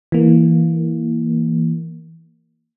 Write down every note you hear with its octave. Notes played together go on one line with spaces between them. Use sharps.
E3 A#3